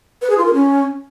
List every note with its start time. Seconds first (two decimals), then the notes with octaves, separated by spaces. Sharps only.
0.22 B4
0.30 G#4
0.38 F4
0.46 A#4
0.54 C#4